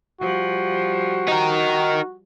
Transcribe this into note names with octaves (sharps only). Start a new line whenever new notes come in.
F3 G3 F#4
D#4 A#4